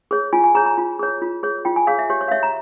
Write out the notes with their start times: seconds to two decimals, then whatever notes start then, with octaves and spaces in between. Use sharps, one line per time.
0.11 G#4 C#5
0.33 F4 G#5
0.44 G#5
0.55 G#4 C#5 A#5
0.66 A#5
0.77 F4
0.99 G#4 C#5
1.22 F4
1.43 G#4 C#5
1.65 F4 G5
1.76 G#5
1.87 G#4 C#5 F5
1.99 E5
2.10 G4 C#5
2.21 C#5
2.28 F5
2.31 C#5 E5
2.43 A#5